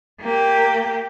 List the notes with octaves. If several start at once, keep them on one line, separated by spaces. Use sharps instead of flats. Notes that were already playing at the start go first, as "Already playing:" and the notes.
A#3 G4